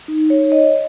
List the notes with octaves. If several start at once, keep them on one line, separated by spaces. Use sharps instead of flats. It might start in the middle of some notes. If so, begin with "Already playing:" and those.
D#4
C#5
D#5